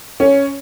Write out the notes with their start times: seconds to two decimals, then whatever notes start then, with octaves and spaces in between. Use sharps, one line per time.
0.20 C#4